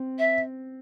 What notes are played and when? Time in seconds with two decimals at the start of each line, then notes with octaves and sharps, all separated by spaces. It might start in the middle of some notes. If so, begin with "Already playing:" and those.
Already playing: C4
0.18 E5